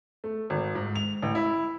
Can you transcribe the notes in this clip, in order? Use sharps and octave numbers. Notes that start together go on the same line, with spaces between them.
A3
G#1
G#2
F7
A1
E4